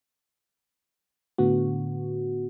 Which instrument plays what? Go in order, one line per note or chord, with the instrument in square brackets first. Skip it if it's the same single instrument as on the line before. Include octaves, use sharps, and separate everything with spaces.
[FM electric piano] A2 D3 B3 F#4